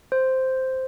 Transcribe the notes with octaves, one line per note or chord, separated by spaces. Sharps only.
C5